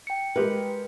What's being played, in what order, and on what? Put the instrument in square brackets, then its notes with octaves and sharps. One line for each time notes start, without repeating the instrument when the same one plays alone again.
[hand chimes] G5 C#7
[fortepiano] G#3 G4 A#4 [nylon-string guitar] B4